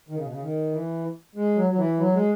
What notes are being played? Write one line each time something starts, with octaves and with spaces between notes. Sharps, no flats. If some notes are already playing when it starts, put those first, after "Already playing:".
D#3
C#3
B2
C#3
D#3
E3
G#3
F#3
F#3
E3
F#3
G#3